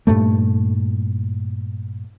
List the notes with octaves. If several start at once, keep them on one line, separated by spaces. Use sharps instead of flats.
G2 A#2 A3